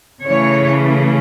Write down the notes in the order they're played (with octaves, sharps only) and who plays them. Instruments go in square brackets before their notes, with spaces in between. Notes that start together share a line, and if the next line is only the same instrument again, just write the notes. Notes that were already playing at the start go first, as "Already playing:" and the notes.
[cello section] C#3 E3 A3 C#5